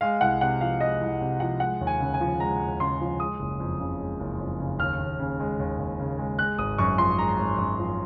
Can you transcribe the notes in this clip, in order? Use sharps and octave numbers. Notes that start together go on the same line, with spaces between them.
G#3 F5
C2 F#5
C3 F#5
F3 F5
G#3 D#5
C2
C3
F3 F#5
G#3 F#5
D#2
G#5
C#3
G#5
F3
G#3 A#5
D#2
C#3 C6
F3
G#3 D#6
F#1
F2
C#3
G#3
F#1
F2
C#3
D#2 F6
D#2
C#3
G#3
D#2
D#2
C#3
G#3
G#3 F#6
G#1 D#6
F#2 C#6
F3 C6
G#3 A#5
G#1
F#2
F3